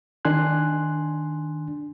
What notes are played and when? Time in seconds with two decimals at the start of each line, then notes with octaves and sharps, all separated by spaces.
0.25 D#3 D4 G#5 C6 F#6